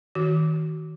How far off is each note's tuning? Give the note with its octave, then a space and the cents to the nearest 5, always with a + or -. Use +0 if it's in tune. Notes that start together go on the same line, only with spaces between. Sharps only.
D#3 +25 F#4 +20